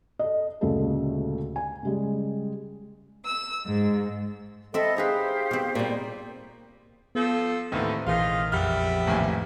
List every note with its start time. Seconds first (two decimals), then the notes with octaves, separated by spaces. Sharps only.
0.19 A4 D#5
0.61 D2 A#2 C#3 G#3 G4 A4
1.56 G#5
1.83 C#3 G3 G#3
3.23 E6
3.67 G#2
4.74 C4 A4 D#5 E5 B5
4.97 D#4 G4 G#4 B4 C5 F5
5.51 B2 C4
5.75 A#2 G3
7.15 F3 B3 A4
7.72 D#2 A2 D3 E3 C4 D#4 A4 C5
8.07 A#1 A#2 D#3 E3 F4 G#4 F5
8.52 F2 G3 B3 E5 F6
9.07 A1 D#2 A3 E4 G#5